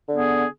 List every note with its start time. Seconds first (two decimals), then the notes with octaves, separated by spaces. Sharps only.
0.08 D3
0.12 B3
0.17 G#4